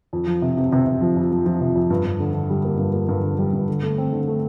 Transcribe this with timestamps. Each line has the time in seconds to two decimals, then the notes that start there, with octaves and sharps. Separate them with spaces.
0.13 F2
0.27 F3
0.42 C3
0.57 C3
0.72 C3
0.87 C3
1.01 F3
1.17 F2
1.32 F3
1.46 F3
1.61 C3
1.75 F2
1.90 G2
2.05 G2
2.20 D3
2.34 D3
2.50 G3
2.65 A#3
2.79 G2
2.93 A#3
3.09 G2
3.23 D3
3.39 G3
3.53 G2
3.68 D3
3.83 A3
3.98 C4
4.12 D3
4.28 A3